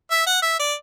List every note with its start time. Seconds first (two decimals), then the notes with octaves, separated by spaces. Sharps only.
0.10 E5
0.26 F#5
0.42 E5
0.59 D5